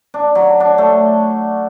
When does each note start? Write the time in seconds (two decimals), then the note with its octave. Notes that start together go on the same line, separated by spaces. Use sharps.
0.14 D4
0.35 F#3
0.60 D4
0.78 A3